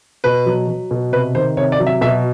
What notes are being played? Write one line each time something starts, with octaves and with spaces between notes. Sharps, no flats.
B2 B4
F#3
F#3
B2
C3 B4
D#3 C5
C3 C#5
D5
F#3
E5
B2 E5